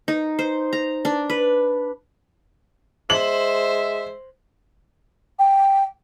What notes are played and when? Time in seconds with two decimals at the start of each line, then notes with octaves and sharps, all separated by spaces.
0.08 D#4
0.39 C5
0.73 A#5
1.05 D4
1.30 B4
3.10 G#3 C5 E5 F#7
5.39 G5